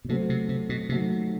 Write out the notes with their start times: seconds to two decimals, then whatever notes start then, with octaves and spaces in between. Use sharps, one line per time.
0.05 B2
0.08 C3 F#3 A3 C4
0.29 C3
0.49 C3
0.69 B2
0.89 C3 C4
0.92 F#3 A3